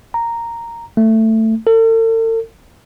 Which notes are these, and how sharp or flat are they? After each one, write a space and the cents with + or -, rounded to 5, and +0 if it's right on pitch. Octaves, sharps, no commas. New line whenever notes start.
A#5 -5
A3 +15
A4 +45